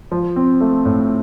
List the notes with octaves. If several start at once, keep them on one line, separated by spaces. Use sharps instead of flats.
F3
C4
A3
A2